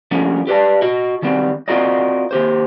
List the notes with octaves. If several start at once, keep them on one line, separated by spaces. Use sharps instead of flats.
F3 G3 A3 A#3 C#4 D4
G4 B4 C5 D5 A5
F#4 D#5
D#3 G3 B3 C4
C4 F4 F#4 A#4 D5 D#5
D#2 G4 C5